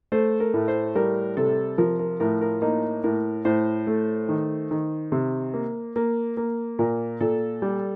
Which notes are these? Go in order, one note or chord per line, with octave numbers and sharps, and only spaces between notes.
A3 C5
A#4
A2
C5
G3 A#4
C3 A4
F3 A#4
A#4
A2 A#4
A#4
A#3 D#4
A2 A#4
A2 C5
A3
D#3
D#3
C3
A#3
A#3
A#3
A#2 A#4
A#2 A4
G3